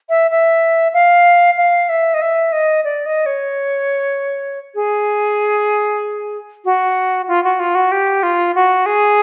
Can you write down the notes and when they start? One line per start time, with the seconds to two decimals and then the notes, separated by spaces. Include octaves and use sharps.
0.09 E5
0.31 E5
0.94 F5
1.57 F5
1.89 E5
2.14 D#5
2.21 E5
2.52 D#5
2.84 D5
3.06 D#5
3.26 C#5
4.75 G#4
6.65 F#4
7.28 F4
7.44 F#4
7.60 F4
7.75 F#4
7.92 G4
8.23 F4
8.55 F#4
8.86 G#4